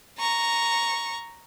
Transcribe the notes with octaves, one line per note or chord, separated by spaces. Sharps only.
A#5 C#6